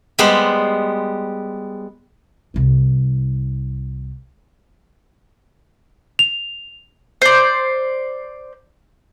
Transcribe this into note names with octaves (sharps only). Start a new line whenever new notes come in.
G3 G#3 B3 C5
C2 G3
F7
C5 D5